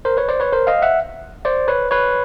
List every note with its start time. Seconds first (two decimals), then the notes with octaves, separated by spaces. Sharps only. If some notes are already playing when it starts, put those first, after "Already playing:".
0.05 A#4 C5
0.17 B4 C#5
0.29 C5 D5
0.40 B4 C#5
0.53 A#4 C5
0.67 D#5 F5
0.82 E5 F#5
1.45 C5 D5
1.68 B4 C#5
1.91 B4 C#5